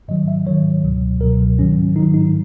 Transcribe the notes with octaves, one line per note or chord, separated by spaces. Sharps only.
G#2 D#3 F#3 D#5
E5
G#2 D#3 F#3 C#5
C#2 B2 F#3
C#2 B2 F#3 A#4
G#2 D#3 F#3 C#4
G#2 D#3 F#3 D#4
D#4